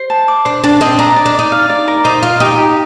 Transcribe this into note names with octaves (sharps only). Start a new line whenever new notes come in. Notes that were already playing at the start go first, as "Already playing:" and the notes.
Already playing: C5
A5
D6
D4 C5
D4 A5
C4 D#5
D4 A#5
D5
D4
D#4 D5
F5
D5
A#4
D#4 C5
F4 F5
D#4 G4
G4